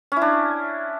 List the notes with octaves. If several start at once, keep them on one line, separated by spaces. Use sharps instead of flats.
C#4 D4 E4